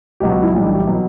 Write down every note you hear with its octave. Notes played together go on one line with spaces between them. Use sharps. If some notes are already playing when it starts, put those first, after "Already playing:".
C#2 B2 F#3 G4
F#4
E4
B1 A2 E3 G3
D4
G4
B2 F#3